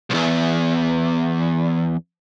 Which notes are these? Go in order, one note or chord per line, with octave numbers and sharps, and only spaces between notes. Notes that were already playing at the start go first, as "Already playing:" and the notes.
B1 E2